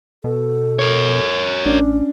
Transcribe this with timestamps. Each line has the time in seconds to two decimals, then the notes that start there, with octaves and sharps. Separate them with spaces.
0.24 B2 A4
0.79 A#4 C#5
1.65 A1 C#4 D4